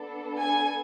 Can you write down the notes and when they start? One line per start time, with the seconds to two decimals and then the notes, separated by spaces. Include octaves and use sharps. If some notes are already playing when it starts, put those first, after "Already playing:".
Already playing: B3 D4 A4
0.39 G#5